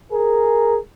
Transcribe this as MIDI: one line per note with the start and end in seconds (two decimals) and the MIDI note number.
0.12 0.77 68
0.12 0.77 70